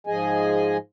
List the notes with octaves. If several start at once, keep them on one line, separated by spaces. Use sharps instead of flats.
G#2 F3 G#4 D#5 G#5